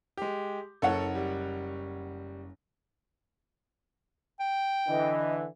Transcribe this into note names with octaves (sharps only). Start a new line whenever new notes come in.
G#3 G4
F#1 A4 C#5 F#5
G3
G5
D3 E3 D#5